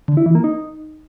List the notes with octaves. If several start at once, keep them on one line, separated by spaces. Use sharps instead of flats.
D3
E4
E3
A#3
D#4